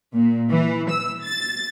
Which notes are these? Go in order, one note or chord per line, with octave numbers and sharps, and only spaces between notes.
A#2
E3
E6
A6